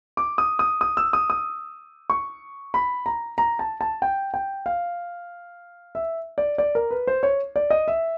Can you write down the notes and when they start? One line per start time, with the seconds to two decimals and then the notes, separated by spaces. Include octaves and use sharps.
0.17 D6
0.38 D#6
0.59 D#6
0.81 D#6
0.97 E6
1.13 D#6
1.30 D#6
2.10 C#6
2.74 B5
3.06 A#5
3.38 A#5
3.59 A5
3.81 A5
4.02 G5
4.34 G5
4.66 F5
5.95 E5
6.38 D5
6.58 D5
6.75 A#4
6.91 B4
7.07 C5
7.23 C#5
7.56 D5
7.70 D#5
7.88 E5